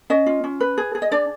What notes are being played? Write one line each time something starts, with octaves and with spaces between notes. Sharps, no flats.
C#4 D#5
F4
C#4
B4
G#4
G#4
D#5
D4 D5